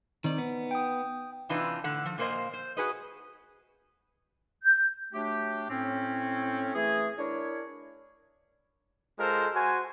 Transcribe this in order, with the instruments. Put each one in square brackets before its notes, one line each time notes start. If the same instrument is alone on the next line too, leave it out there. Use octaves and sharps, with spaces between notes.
[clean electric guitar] D#3 C4 D5 [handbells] D#4
[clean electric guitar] B3
[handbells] G5 D#6
[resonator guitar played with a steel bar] C3 E3 D4 D#4 F4 B4
A2 D3 F#5
F3
A#2 A#3 C5 D#5
C5
F#4 G#4 B4 D#5
[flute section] G6
[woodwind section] F#3 A3 D4 G4
A2 C4 C#4
E3 A3 E4 G#4
D4 E4 A#4 C#5
[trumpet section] G#3 F4 A4 A#4 C5
F#4 C5 G#5